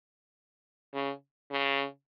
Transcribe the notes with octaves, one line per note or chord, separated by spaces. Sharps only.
C#3
C#3